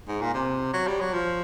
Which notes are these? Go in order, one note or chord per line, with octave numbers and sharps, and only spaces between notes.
G#2
A#2
C3
F#3
G3
F#3
F3